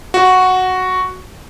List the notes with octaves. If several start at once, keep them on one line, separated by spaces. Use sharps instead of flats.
F#4